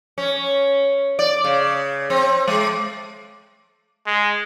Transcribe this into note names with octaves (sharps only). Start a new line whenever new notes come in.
C#4
D5
C#3
C4
G#3
G#3